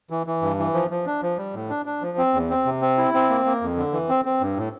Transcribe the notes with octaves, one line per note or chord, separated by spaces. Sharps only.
E3
E3
G2
E3
F3
F3
D4
F3
G3
A2
D4
D4
F3
C4
E2
C4
C3
C4
E4
C4
A#3
A#3
F2
D3
E3
C4
C4
G2
A2